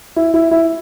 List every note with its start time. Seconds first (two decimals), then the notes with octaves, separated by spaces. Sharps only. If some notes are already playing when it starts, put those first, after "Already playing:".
0.16 E4
0.34 E4
0.51 E4